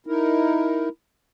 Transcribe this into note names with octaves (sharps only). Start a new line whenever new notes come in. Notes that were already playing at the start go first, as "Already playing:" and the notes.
D#4 E4 A#4